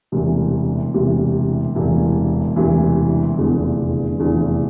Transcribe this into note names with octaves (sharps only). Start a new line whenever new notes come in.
E1 D2 C3 E3
E1 D2 C3 E3
E1 D2 C3 E3
E1 D2 C3 E3
F1 E2 D3
F1 E2 D3